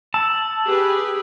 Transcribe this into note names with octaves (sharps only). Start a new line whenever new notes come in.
A5 E6
G4 G#4 B4